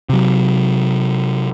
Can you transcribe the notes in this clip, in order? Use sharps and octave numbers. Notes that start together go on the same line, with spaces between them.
C3 F#3